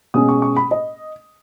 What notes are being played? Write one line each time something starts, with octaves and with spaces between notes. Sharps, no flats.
B2 G#3 C#4 D#6
C#6
C#6
B5
D#5